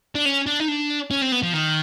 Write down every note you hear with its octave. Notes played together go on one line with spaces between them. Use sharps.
D4
C#4
D4
D#4
D4
C#4
C4
B3
F3
D#3